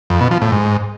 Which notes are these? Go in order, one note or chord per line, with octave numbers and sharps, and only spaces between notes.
F2
B2
F3
A2
G#2